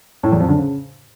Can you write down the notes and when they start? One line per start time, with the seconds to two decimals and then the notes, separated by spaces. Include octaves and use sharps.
0.23 A2
0.32 E2
0.40 F2
0.49 D3
0.57 C#3